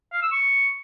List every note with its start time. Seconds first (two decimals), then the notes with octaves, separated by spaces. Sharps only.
0.13 F5
0.22 E6
0.32 C#6